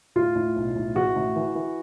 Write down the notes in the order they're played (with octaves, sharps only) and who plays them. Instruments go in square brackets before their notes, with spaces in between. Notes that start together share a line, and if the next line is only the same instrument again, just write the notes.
[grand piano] A2 F4
A2
B1
A2
A1 F#4
A2
E3
E3